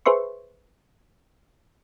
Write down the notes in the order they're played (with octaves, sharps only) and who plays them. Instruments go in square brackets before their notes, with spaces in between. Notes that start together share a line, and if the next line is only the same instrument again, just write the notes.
[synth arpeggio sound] G#4 B4 C5 E5 C6 C#6